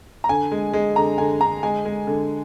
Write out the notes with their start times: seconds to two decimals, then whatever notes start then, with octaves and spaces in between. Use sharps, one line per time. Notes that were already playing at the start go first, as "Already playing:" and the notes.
0.24 A#5
0.29 D3 G#5
0.52 G#3
0.74 G#3
0.96 D3 A#5
1.18 D3 G#5
1.40 D3 A#5
1.63 G#3 G#5
1.85 G#3
2.07 D3